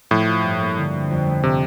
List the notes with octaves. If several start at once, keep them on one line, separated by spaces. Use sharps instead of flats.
A2 F3
F4
G2
A#3
D3
C4
F2
A3
C3 A3